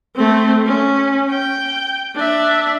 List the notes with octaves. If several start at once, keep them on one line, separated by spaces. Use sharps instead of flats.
A3 C4
C#4
G5
D4 E5